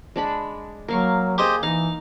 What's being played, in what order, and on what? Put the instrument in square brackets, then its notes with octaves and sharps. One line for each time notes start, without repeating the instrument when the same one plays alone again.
[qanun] G#3 D4 B5
[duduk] F#3 [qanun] A#3 F5 C#6
[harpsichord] G4 C5 D#5 [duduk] G#4
[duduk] E3 [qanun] D#4 [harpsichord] F5